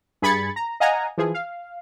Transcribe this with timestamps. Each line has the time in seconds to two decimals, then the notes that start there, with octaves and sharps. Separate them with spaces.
0.22 G2 G#4 B5 G#6 A6 C#7
0.56 A#5
0.80 D#5 F5 F#5 G#5 A#5
1.18 E3 F3 G#4
1.34 F5